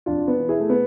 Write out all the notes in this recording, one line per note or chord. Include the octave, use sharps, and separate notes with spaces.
F2 D4 F4
B3
E3
E4 G#4
A3
B3